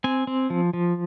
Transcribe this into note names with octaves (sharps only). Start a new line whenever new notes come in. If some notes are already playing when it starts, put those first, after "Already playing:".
C4 G#5
C4
F3
F3